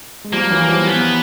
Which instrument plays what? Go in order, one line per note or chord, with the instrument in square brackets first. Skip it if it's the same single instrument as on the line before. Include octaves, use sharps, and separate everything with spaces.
[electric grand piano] G#3
[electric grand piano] F3 G3 [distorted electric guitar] A#3
[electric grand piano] E3 F#3
F3 G3
[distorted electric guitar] B3